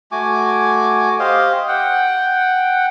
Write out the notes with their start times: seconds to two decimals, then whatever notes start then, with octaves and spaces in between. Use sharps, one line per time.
0.12 A3 F#4 G#5 D6
1.19 G4 C5 D#5 F5
1.68 F#5 G5